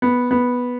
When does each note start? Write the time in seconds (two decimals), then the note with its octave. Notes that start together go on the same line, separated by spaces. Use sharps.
0.02 B3
0.31 B3